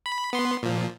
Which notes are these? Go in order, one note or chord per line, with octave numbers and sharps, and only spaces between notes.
B5
B3 C6
A#2 F3